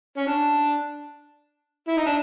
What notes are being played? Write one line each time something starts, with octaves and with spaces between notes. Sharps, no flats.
C#4
D4
E4
D#4
D4